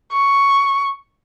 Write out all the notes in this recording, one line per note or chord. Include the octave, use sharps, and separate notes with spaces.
C#6